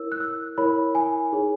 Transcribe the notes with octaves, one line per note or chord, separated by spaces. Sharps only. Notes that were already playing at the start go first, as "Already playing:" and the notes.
Already playing: E4 A#4 C#5 E6
F#6
E6
E4 A#4 C#5 B5
G#5
D#4 G#4 C#5